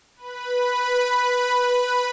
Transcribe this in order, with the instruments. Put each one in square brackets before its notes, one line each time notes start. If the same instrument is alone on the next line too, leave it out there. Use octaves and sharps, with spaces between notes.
[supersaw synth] B4 B5